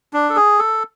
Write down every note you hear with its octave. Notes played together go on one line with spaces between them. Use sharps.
D4
A4
G#4
A4